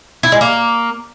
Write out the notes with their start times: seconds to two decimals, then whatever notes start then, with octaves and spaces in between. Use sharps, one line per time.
0.23 E4
0.32 G#3
0.41 A#3